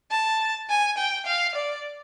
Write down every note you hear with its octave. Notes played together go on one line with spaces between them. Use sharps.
A5
G#5
G5
F5
D5